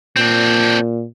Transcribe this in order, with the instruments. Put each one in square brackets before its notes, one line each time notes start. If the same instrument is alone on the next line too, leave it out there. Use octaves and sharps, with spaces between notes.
[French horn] A#2 [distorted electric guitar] C4 D4